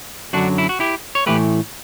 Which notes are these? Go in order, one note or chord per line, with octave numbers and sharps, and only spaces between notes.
F#2 D3 F#3 D4 F#4
E4
F#4
E4 G4
C#5
A2 E3 A3 G4 B4